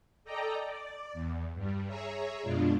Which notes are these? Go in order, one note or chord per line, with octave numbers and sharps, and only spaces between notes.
A4 D5 D#5 G5 A#5
D5
E2
G2 G3
G#4 C#5 E5 A#5
F#2 B2 G#3 D4 F4